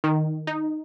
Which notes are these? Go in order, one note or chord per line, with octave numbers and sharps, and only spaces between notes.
D#3
D#4